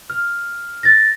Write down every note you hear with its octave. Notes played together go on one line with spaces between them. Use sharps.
F6
A6 A#6